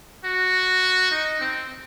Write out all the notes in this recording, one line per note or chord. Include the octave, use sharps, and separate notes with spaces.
F#4
D#4
C4